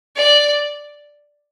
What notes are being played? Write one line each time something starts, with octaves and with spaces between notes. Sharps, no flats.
D5